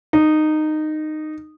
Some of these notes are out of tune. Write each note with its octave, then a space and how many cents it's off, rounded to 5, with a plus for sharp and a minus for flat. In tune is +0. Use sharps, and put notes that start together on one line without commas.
D#4 -15